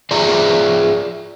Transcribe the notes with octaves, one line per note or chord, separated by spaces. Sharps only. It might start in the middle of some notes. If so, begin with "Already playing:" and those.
F4 G#4 D5 E5 A#5